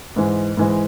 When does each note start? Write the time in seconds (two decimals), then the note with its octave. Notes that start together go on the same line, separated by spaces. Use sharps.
0.16 G#2 E3 G#3
0.57 G#2 E3 G#3